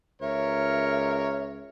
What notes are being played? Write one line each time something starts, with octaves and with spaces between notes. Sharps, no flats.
C#2 A#4 C#5 E5